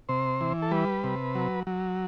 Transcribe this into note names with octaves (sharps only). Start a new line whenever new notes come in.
C3 C5
E3
A4
G3 B4
C3
F#3
F#3